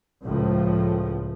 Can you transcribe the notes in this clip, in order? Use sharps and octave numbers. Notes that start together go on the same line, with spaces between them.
C#2 A2 F3